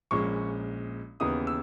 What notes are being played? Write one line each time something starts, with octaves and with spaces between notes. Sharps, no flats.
A#1 A#2 G#3 C#4 C#6
D#2 C#3 E3 B3 D#4 D#6
E6